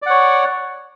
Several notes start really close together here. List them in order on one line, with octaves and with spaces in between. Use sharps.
D5 F#5 C#5